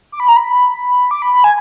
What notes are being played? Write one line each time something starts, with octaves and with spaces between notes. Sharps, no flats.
D6
B5
A#5
B5
D6
B5
B5
G#5